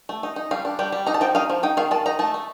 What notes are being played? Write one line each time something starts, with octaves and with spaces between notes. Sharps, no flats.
A3
D#4
D#4
G3 F5
D4
G3 G5
G3
D#4 A#5
A5
F3 G5
D#4 F5
F3
D#4 G5
D#3 F5
D#3 A5
D#4 A#5
A3 A5
A3